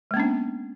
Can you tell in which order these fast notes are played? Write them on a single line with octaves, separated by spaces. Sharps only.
G#3 A#3 C#4 D4 B3